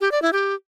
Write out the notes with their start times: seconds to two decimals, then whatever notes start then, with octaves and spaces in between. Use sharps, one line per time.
0.01 G4
0.12 D5
0.22 E4
0.33 G4